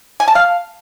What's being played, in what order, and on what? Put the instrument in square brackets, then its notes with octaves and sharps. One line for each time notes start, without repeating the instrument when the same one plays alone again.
[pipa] G#5
A5
F5